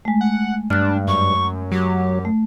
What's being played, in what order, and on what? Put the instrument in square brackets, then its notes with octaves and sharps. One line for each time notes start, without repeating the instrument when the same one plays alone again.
[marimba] G#3 A3
[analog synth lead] F#5
[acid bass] G2 [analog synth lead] D4 [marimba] F6 F#6
[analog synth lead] F#2 [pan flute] C#6
[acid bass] F#3 [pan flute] G4
[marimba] A3